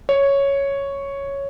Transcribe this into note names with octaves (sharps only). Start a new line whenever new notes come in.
C#5